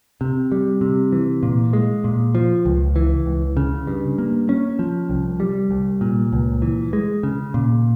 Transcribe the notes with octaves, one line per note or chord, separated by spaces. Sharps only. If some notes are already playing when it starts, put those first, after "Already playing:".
C3
G3
C3
E3
A#2
G#3
A#2
F3
C#2
E3
C#2
C#3
G2
A#3
C#4
F3
C2
G3
C2
A#2
C#2
E3
G#3
C#3
A#2